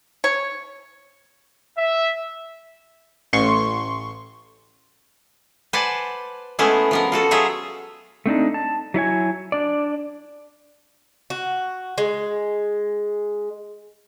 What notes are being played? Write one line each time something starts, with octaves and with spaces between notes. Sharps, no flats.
C#5
E5
A1 C6 C#6
B4 C5 D5 F#5 G#5 A5
G#3 A3 B3 C#4 E4 G#4
F3 B3 A#4
F4 F#4 A4
F#3 F4 G#4 E5 A#5
A3 C4 D4 D#4
A5
F#3 E4 C#5 G#5
D4 D5
F#4
G#3